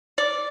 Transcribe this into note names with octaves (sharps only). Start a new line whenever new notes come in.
D5